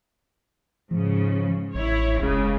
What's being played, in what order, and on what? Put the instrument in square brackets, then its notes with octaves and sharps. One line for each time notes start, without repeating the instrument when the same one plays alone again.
[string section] G#2 C#3 [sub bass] F3
[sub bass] A1 [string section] E4 C#5
[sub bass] F1 [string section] C#2 C#3